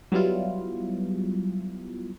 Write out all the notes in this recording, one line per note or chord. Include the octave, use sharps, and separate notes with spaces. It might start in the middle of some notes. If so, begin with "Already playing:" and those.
F#3 G3 B3 E4 F4